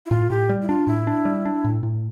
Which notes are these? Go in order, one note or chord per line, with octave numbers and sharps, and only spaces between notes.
E4
A2 F4
A2 G4
G3
E4
D4 F4
A2 E4
D4
G3
D4
A2
A2